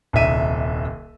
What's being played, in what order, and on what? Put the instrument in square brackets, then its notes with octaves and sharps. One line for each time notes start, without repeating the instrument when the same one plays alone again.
[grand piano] D#1 C2 D#4 E5 D#7